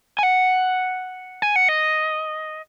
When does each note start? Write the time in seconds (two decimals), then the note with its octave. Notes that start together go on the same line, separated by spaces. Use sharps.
0.19 G#5
0.23 F#5
1.42 G#5
1.56 F#5
1.69 D#5